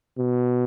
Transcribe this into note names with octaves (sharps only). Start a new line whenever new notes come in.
B2